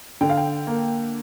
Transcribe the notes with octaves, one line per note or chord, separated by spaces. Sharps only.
D3 G5
F5
G5
A#3